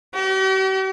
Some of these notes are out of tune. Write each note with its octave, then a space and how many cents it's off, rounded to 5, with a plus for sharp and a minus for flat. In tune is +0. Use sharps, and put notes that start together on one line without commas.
G4 -45